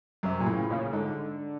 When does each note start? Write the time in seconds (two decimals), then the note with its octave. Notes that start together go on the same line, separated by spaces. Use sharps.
0.23 F#2 C3
0.40 A#2
0.46 A2 C#3
0.70 A#2 C#3
0.93 G#2 D3